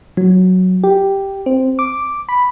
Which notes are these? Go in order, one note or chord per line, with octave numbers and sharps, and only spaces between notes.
F#3
G4
C4
D6
B5